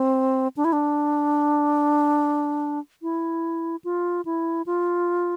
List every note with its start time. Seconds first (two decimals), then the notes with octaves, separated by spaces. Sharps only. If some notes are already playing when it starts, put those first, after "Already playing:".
Already playing: C4
0.57 D4
0.65 E4
0.73 D4
3.02 E4
3.84 F4
4.25 E4
4.66 F4